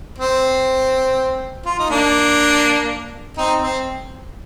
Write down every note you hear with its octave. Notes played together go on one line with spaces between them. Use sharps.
C4
F4
D#4
A#3 D4
C4 D#4
C4